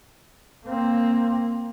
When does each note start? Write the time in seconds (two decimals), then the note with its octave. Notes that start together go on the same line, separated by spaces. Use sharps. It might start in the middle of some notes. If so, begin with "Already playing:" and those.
0.66 A#3 C4